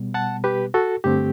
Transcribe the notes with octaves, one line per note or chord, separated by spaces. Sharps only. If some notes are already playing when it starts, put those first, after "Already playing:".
Already playing: B2 G3 B3
F#5 A5
G4 B4
F#4 A4
G2 D3 A3 C4 G4